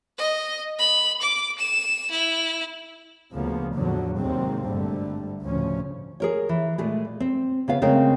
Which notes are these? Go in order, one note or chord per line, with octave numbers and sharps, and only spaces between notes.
D#5
B5
D6
E7
E4
D2 C#3 F3 A#3 B3
E2 A2 D3 F3 F#3
D#2 G#2 C3 F#3 G#3 C4
G#1 G2 D3 G3 A3
D2 A2 C#3 F3 C#4
G#4 A#4 C#5
E3
A#2 G#3 A3 G#4
C4
C#3 B3 F5
C#3 G#3 A3 C4 A#4